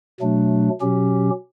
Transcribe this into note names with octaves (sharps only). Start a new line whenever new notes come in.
B2 F#3 A3 D4
B2 F#3 C#4 G4